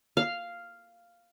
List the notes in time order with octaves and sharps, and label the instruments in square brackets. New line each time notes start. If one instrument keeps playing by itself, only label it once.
[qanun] F5